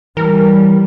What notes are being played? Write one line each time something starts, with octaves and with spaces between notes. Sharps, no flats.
E3 G3 A#4